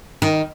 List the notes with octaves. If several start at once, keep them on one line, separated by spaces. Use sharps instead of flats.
D#3